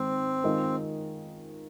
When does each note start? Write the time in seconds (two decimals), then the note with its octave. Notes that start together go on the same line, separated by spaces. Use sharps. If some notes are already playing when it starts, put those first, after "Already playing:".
Already playing: G#2 D#3 G#3 C4
0.44 D#3 G#3 F4 A#4 D#5